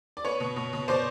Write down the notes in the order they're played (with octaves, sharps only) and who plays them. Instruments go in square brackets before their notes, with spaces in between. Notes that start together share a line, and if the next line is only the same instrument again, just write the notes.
[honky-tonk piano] D5
B3 B4 C#5
B2
B2
B2
B2 C5 D5